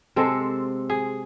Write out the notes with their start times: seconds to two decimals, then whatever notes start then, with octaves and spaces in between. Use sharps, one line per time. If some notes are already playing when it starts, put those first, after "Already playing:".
0.16 C3 G#3 C4 A4
0.90 G#4